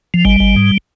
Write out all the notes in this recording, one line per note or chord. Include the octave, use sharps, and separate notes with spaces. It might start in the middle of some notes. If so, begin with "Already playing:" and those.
F3
G#1 G3
G#1
G#2